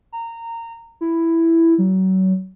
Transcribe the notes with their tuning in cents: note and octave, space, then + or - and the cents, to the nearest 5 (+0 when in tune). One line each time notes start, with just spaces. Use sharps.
A#5 -20
E4 +5
F#3 +30